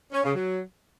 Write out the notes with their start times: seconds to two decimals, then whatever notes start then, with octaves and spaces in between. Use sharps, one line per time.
0.12 C#4
0.23 C#3
0.35 F#3